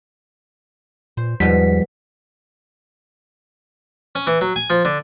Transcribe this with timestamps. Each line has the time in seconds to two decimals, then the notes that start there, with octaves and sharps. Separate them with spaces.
1.17 A#2 C5
1.40 E2 G#2 B2 F3 G3 B6
4.15 C#4
4.27 E3
4.41 F#3
4.56 G#5
4.70 F3
4.85 D3